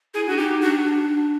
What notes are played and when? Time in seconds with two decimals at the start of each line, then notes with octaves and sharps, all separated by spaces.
0.14 E4 G#4
0.27 D4 F#4
0.38 D#4 G4
0.61 D4 F#4